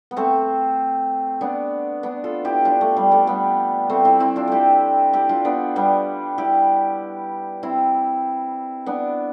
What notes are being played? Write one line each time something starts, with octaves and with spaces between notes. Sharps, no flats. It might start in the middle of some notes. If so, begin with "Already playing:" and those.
B3
A3 C4
B3 D4
B3 D4
F4 A4
E4 G4
D4 F4
A3
G3
A3
G3 B3
A3 C4
C4 E4
C4 E4
D4 F4
E4 G4 A4
E4 G4
D4 F4
B3 D4
G3 B3
E4 G4
C4 E4
B3 D4